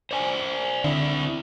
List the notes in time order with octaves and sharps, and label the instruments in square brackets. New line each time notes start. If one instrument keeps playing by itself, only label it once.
[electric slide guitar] C5 D5 G#5
[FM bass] D3 [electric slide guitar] C4 E4 E5